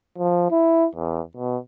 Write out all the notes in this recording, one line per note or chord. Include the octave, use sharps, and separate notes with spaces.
F3
E4
E2
B2